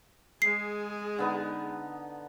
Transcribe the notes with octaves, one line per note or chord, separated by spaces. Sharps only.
G#3 G#4 C7
D3 B3 D#4